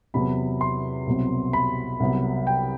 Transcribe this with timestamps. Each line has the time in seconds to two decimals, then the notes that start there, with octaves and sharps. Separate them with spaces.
0.14 E2 C3 F#3 B3 B5
0.61 C6
1.07 C2 B2 F#3 C4
1.53 B5
2.00 C2 C3 F#3 B3
2.47 G5